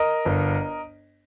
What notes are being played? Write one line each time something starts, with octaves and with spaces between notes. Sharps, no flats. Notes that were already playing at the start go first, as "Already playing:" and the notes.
Already playing: A#4 D#5
G1